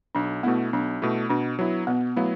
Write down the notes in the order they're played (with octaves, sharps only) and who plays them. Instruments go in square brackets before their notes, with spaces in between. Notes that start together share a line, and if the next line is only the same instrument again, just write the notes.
[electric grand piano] B1 [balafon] D4
[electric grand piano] B2 A3 E4 [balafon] B3
[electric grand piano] B1 [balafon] D4
[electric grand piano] B2 A3 E4
[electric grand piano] B2 [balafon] D4
[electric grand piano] F#3 B3 E4
[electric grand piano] B2 [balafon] B3
[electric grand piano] F#3 B3 E4 [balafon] A3